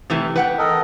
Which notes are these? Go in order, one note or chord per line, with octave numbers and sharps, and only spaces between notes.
C3 E3 A3
B4 F#5 G5
A4 A#4 D#5